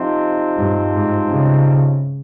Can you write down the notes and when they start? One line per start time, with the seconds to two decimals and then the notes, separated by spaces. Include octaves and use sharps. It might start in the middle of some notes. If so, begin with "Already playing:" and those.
Already playing: C3 F3 C4 D#4
0.58 G2
0.94 G#2
1.31 C#3